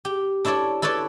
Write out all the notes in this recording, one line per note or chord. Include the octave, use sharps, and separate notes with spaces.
G4
D4 E4 A4 C#5 D5
E4 A4 B4 C#5 D5